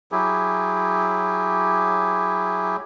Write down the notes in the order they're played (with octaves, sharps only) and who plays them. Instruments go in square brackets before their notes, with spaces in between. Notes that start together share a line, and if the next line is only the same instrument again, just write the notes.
[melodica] F#3 E4 G4 G#4